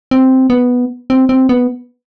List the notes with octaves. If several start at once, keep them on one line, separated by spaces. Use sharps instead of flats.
C4
B3
C4
C4
B3